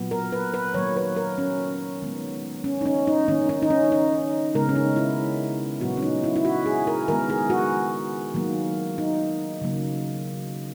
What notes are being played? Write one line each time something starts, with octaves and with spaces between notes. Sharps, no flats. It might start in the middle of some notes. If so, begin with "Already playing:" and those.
Already playing: A#2 F#3 B3
A#4
B4
B4
D#3 F#3 A#3 C#5
B4
A#4
C#4
D#3 G#3 B3
C#4
D#4
C#4
D#4
D#3 A#3 C#4
D#4
D#4
C#4
D#4
C#3 G#3 B3 A#4
C#4
D#4
E4
A#2 F#3 B3 F#4
C#4
D#4
E4
E4
F#4
G#4
A#4
D#3 G#3 B3 A#4
G#4
F#4
D#3 F#3 A#3
D#4
C#3 F#3 A#3